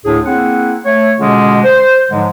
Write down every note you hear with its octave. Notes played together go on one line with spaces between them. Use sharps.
D2 A2 D3 D4 G#4
A#3 C4 E4 G#4 F#5
A3 C#5
B2 D3 G#3 C#4 F4 G#4
C5
G#2 D3 F3 F#3 G#3